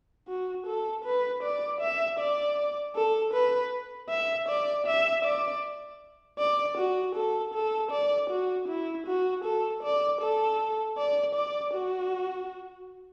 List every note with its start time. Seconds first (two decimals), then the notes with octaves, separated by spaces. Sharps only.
0.28 F#4
0.67 A4
1.05 B4
1.43 D5
1.81 E5
2.19 D5
2.96 A4
3.34 B4
4.10 E5
4.48 D5
4.87 E5
5.25 D5
6.39 D5
6.78 F#4
7.15 A4
7.54 A4
7.91 D5
8.30 F#4
8.68 E4
9.07 F#4
9.44 A4
9.83 D5
10.21 A4
10.97 D5
11.35 D5
11.73 F#4